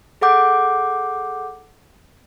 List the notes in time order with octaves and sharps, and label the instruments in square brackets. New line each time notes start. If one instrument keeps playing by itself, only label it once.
[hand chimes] G#4 A4 F#5 D6 G6